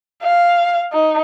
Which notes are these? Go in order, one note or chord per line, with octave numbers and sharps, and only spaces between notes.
F5
D#4